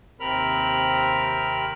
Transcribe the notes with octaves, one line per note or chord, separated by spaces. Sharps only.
D#2 C3 C4 A#4 B5 F6